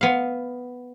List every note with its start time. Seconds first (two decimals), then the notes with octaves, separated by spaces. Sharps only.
0.01 B3 F5